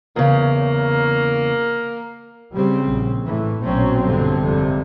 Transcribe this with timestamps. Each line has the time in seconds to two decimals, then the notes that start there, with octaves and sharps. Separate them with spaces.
0.16 E2 C#3 A#3
2.55 C#3 G3 C4
2.88 A#1
3.26 A2 E3
3.63 A#1 B2 F#3 C4 C#4
4.03 G2 D3
4.40 G#1 F2 C3